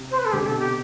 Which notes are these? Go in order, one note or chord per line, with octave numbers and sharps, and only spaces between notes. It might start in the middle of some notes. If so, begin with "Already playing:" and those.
Already playing: C3
C5
B4
A4
D3 G4
C3
B2 A4
C3 G4